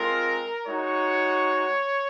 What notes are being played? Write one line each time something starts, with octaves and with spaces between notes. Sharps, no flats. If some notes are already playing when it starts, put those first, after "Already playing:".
Already playing: G#3 C4 F4 A#4
G#3 D#4 F#4 C#5